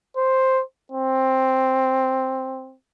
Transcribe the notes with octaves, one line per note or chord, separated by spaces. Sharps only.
C5
C4